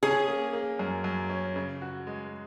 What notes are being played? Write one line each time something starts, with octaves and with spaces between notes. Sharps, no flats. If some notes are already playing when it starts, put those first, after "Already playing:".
C#4 G#4
A#3
A#3
F#2
F#2
C#4
C#3
F#4
G#3